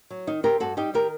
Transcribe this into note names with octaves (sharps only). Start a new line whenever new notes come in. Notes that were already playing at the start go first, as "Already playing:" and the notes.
F#3
D#3 D#4
C4 G4 A#4
G2 F#4 A4
G3 D#4 G4
D#3 G4 A#4